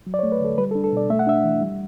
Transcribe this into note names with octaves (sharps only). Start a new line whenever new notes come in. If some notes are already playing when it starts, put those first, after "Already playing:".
F#3
D5
C#5
A3
B4
D3 A4
G3 B4
A4
D4
A4
B2 D5
A3 E5
F#5
D4 E5
E3
G3